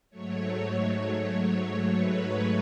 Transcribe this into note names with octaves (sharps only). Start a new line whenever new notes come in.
G#2 F#3 A3 C#5
B4